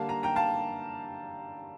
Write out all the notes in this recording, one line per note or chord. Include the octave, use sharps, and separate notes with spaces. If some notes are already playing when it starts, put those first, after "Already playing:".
Already playing: D3 G3 A#3 D4 F5 A5
A#5
G5 A#5
F5 A5